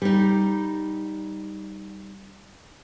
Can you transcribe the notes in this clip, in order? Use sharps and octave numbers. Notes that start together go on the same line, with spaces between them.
G3 D#4